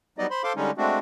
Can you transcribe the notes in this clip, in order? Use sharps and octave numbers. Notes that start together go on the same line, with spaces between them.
F#3 G3 B3 D#4 D5 D#5
C5 B5 C6
A4 C5 F5 C6 D6
D3 G3 G#3 C#4 D#4
G#3 A3 C4 D4 F#4